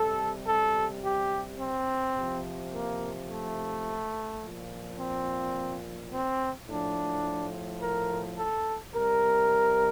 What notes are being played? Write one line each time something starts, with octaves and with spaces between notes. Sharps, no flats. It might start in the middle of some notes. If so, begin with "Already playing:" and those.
Already playing: C3 G3 A4
A4
G4
C4
C3 F3
A#3
A3
A#2 F3
C4
C4
A2 F3 D4
A#4
A4
C3 G3 A#4